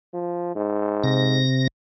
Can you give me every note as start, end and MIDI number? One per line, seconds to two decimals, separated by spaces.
0.13 0.51 53
0.55 1.39 44
1.04 1.67 48
1.04 1.67 94